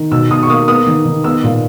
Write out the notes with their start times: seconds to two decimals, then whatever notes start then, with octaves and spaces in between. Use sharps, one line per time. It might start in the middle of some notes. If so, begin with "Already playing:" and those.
Already playing: D#3
0.12 B2 E6
0.31 B2 D#6
0.43 C#6
0.49 A#3 D#6
0.68 B3 D#6
0.86 D#3
1.06 D#3
1.24 B3 E6
1.44 A#2